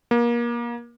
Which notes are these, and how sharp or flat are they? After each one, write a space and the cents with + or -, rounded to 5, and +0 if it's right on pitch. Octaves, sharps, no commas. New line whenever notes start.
A#3 +30